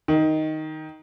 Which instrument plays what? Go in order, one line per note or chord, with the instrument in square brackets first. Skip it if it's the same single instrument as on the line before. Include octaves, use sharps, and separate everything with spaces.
[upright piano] D#3